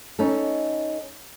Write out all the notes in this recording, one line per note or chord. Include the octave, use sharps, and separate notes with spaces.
C#4 D#4 A4